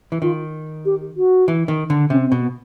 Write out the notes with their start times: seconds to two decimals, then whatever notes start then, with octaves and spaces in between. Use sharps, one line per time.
0.12 E3
0.22 D#3 F4
0.85 G4
1.17 F#4
1.48 E3
1.68 D#3
1.90 D3
2.10 C3 C#4
2.26 C4
2.32 B2
2.42 B3